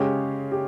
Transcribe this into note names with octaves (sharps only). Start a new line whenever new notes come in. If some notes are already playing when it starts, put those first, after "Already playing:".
Already playing: C#3 G#3 C#4 G4
G4